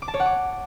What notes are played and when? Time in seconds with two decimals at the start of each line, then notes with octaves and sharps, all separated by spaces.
0.02 D6
0.08 A5
0.14 C#5
0.20 F#5
0.26 D6